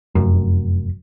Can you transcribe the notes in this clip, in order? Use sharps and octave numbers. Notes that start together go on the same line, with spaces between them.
F1 F#2